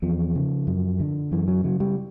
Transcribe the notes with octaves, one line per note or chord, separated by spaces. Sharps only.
E2 F3
C#3
F#2
D3
F#2 E3
F#3
C#3 F#3
G3